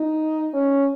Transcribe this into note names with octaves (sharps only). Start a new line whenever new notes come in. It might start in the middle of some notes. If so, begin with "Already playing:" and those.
Already playing: D#4
C#4